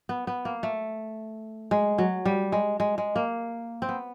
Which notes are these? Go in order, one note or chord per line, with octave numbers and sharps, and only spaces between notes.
B3
B3
A#3
A3
G#3
F#3
G3
G#3
G#3
G#3
A#3
C4
B3